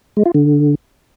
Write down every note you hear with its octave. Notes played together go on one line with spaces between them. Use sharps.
G#3
F4
D3